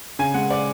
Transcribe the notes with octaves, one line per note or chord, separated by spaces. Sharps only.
C#3 G#5
G#3 F#5
D5